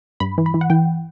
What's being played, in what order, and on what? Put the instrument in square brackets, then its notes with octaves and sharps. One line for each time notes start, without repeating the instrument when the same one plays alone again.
[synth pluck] G2 B5
E3
B5
E3
F#5
E3 G5